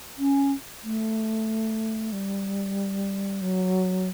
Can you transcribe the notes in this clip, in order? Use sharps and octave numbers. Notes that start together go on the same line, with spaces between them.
C#4
A3
G3
F#3